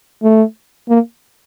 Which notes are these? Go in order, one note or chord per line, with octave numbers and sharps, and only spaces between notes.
A3
A#3